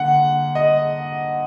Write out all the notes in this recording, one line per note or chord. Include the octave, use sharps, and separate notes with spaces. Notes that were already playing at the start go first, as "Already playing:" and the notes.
Already playing: D3 A#3 F#5
D#5